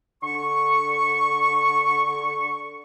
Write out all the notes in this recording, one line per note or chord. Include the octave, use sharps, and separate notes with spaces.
D3 C#6